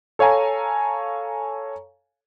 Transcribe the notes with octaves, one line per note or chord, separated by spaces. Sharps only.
A4 C#5 F5 G#5 A#5